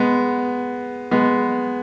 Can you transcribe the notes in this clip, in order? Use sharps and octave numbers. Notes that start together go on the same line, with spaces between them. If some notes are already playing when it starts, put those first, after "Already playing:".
Already playing: G#3 B3
G#3 B3